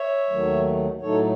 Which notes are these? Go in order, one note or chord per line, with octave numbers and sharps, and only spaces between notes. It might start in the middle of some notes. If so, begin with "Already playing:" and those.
Already playing: C#5 E5
D#2 D#3 F#3 A3
A2 F#3 A3 D#4 A4 C#5